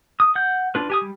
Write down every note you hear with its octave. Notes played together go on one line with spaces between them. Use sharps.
D#6
F#5 G6
D4 F4 B4
G4 G#5 D#6
G3